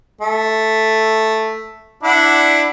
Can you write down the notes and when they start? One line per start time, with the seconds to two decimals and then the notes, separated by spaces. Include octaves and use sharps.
0.21 A3
2.03 D4 E4 F#5